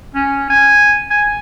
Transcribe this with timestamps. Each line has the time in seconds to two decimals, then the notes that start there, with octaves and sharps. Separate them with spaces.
0.15 C#4
0.50 G#5
1.11 G#5